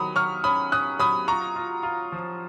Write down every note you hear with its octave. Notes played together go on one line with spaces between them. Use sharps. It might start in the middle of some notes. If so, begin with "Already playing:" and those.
Already playing: D#3 F#3 B5 D#6
F#3 C#6 F6
C#4 B5 D#6
C#4 D#6 F#6
F#3 B5 D#6
F4 A#5 C#6
F4
F4
F3